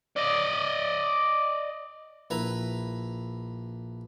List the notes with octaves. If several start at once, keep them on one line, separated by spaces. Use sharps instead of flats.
D5 D#5
A#1 E4 B4 A#5